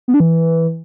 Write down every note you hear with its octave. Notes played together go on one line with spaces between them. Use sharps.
B3
D4
E3